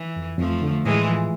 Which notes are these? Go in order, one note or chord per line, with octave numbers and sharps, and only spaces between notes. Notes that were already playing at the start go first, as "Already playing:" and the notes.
Already playing: E3
F2
F2 F3 A3
D3
A2 E3 G#3
F3